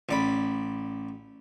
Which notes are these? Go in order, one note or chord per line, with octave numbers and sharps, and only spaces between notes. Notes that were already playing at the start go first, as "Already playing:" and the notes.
A1 D5 B5